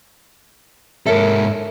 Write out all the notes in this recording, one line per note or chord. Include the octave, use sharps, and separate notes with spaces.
G#2 A4 A#4 C#5 E5